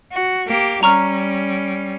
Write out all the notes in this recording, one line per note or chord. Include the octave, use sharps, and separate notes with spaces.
F#4
A#3 G4
G3 C#4 A#5 C#6 F6